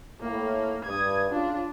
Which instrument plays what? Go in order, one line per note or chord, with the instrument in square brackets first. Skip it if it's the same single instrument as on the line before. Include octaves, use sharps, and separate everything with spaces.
[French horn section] A2 [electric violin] A#3
[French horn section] G2 [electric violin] D#6 G#6
[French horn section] C#3 F4 [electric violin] D4